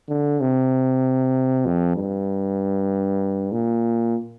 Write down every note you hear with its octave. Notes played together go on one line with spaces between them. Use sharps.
D3
C3
F2
G2
A#2